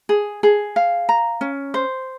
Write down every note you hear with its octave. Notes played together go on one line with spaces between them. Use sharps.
G#4
G#4
F5
A#5
C#4
C5